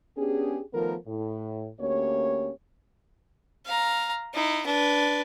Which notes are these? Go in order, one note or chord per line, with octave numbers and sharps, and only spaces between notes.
B3 C#4 D4 G4 G#4
D#3 F3 A3 B3 A#4
A2
D2 A#3 C#4 G4 C#5
F5 A#5
D#4 E4
D4 B4